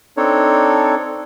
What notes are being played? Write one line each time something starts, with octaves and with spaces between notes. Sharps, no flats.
C4 D4 D#4 A4 C#5